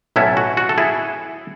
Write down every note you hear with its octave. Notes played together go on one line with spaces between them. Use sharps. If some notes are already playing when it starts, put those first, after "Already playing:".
B1 A2 F#3 A3 C#4 E4
F#4
F#4
A4
E4 G#4